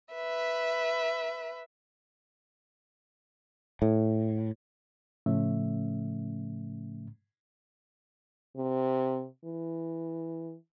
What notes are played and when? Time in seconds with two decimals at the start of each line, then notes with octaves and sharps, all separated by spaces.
0.14 B4 E5
3.82 A2
5.26 A2 C#3 F3 A3 C#4 E5
8.57 C3
9.45 E3